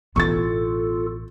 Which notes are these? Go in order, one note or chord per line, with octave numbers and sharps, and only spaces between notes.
A1 B2 E3 B3 F4 A4 C#6 A6